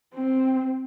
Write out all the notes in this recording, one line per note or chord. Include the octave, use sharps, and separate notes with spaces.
C4